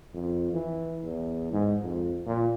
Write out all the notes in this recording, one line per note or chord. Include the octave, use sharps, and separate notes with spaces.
F2
E3
E2
G#2
F2
A#2